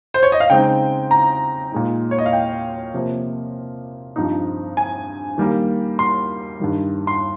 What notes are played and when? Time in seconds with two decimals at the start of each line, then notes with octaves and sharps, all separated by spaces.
0.14 C5
0.23 C#5
0.32 D#5
0.40 F5
0.50 C#3 G#3 C4 D#4 G5
1.11 A#5
1.72 A#2 G#3 D#4
2.11 C#5
2.18 D#5
2.26 F5
2.33 G5
2.94 C3 F3 A#3
4.16 G2 F3 C4 D#4
4.77 G#5
5.38 D#3 G3 A#3
5.99 C6
6.60 G2 D#3 G3
7.07 C6